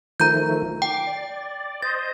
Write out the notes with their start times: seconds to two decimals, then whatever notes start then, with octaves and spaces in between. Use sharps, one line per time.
0.20 D#3 F3 A3 A#5 G6
0.82 G5 D6
1.07 D5
1.82 C5 D#5 A6